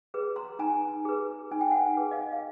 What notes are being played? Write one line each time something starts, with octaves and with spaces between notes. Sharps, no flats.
G#4 B4
A#5 C6
D#4 G#5 A#5
G#4 B4
D#4 G#5
G5
F#5 G#5
G#4 B4
D#5 F5
F5